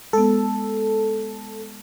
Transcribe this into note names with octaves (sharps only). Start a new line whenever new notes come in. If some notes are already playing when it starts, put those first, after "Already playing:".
G#3 B3 A4